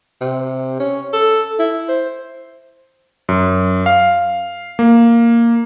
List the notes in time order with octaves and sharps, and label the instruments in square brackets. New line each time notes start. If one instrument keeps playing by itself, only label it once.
[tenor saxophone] C3
C#4
A4
E4
C5
[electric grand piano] F#2
F5
A#3